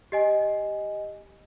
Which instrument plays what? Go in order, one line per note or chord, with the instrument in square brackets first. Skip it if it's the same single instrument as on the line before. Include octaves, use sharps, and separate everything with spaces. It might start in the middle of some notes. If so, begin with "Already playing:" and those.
[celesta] G4 D#5 G#5